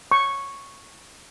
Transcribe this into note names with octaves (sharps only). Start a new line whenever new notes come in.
C#6